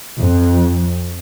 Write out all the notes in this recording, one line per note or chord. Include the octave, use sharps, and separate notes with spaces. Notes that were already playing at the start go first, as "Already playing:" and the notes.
F2